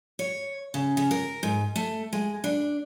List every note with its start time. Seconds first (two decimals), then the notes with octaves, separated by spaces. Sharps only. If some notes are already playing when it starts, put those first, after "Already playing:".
0.19 C#5
0.74 C#3
0.97 C#3
1.11 A#4
1.43 G#2
1.76 A3
2.13 G#3
2.44 D4